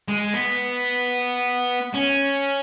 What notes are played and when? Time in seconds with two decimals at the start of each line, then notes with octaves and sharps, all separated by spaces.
0.08 G#3
0.34 B3
1.94 C#4